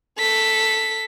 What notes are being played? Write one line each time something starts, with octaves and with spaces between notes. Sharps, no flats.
A4 B6